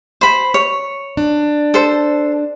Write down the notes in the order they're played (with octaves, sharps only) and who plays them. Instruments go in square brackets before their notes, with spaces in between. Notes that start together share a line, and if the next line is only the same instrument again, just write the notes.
[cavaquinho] C5 B5
C#5
[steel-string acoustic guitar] D4
[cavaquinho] A4 C5